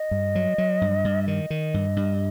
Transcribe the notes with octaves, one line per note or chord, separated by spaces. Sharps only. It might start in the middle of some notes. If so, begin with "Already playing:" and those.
Already playing: D#5
G2
F#3
F#3
G2
G2
E5
D#3 D#5
D#3
G2
G2